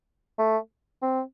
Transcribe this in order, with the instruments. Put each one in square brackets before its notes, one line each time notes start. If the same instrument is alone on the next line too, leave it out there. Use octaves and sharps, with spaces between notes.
[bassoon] A3
C4